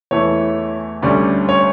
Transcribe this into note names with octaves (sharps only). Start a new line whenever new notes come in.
E2 E3 A3 E4 C#5
D2 D3 G3 C#4 D5
C#5